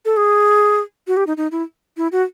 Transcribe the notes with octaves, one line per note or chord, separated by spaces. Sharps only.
A4
G#4
F#4
G4
D#4
D#4
E4
E4
F#4